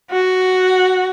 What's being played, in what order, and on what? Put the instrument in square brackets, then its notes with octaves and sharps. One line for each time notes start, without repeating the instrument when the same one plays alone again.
[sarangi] F#4